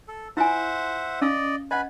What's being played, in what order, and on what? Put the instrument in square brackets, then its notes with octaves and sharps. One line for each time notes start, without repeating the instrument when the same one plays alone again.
[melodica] A4
[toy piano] E4 F4 G#5 [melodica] C5 E5 F#5
[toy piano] C#4 F5 E6 [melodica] D5 D#5
[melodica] B4 G#5 B5 [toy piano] D#5 F#5